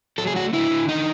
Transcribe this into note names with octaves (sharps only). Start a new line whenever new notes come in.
F#3 A4
G#4
A3 F#4
D3 E4
D3
D#3 D#4